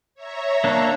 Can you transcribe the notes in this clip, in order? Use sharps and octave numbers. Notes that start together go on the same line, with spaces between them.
C#5 E5 A#5
A#3 D4